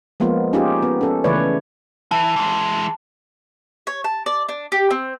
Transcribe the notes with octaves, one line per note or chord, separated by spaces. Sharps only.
F3 G#3 A#3 B3 F4
C#4 D#4 F4 G4 G#4
B3
C#4 A4
C#3 E3 A3 B4 C#5 D5
E3 A5
E3 G#3
C#5
A5
D5
D4
G4
C4